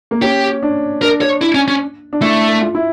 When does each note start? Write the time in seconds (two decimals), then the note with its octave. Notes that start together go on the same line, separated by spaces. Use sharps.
0.11 A#3
0.22 C#4 G4
0.63 D4
1.02 D4 A#4
1.22 C#5
1.41 E4
1.55 C#4
1.68 C#4
2.13 D4
2.21 A3 E4
2.61 F4
2.75 E4